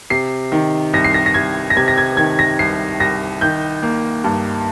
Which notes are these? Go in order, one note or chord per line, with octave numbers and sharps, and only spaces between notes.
C3 C7
D#3
C2 A#6
C7
A#6
A#6
C2 G#6
A#6
C3 G#6
A#6
G#6
D#3 G#6
A#6
C2 C7
C2 A#6
D#3 G6
A#3
G2